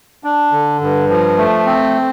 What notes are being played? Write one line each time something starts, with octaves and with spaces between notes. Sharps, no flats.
D4
D3
G2
F3
A3
C4